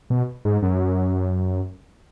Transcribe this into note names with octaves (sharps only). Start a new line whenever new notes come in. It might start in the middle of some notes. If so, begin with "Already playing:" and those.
B2
G#2
F#2